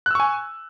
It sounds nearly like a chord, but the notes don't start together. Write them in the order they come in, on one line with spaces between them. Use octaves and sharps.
F#6 E6 C#6 G#5